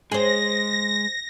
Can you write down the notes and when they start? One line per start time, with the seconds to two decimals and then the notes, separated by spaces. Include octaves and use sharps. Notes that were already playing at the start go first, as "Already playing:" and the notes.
0.12 G#3 G#4 C5 A#6